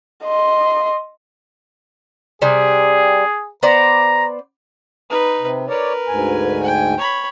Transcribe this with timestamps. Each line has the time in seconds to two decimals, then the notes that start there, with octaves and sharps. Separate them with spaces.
0.24 D#5 C6
2.42 C3 G3 G#4
3.63 B3 C5 D5 A#5
5.10 D#4 B4
5.39 C3
5.68 A#4 B4 C#5 D5
6.08 D2 G#2 G#5
6.63 G5
6.98 C#5 B5